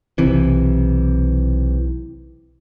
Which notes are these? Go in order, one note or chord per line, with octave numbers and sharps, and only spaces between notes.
B1 C3 E3